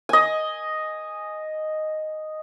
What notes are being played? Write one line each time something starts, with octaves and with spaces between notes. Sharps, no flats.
D#5 G#5